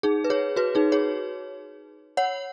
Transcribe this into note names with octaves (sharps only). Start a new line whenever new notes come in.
D#4 G#4
B4
G#4 C#5
F#4 B4
D#4 G#4
G#4 C#5
C#5 F#5